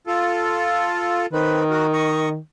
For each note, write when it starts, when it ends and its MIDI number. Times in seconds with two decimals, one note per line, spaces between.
0.07 1.26 65
0.07 1.26 69
1.33 2.38 51
1.33 1.64 60
1.33 1.64 71
1.71 1.87 66
1.71 1.87 70
1.93 2.29 75
1.93 2.29 85